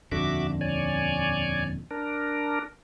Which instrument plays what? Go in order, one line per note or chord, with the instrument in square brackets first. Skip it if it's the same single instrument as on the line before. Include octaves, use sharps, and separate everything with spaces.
[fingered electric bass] D#1 F2 D3 [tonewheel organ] F#4 E5 D6
[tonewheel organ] C#5 D5 G#5
D4 A#4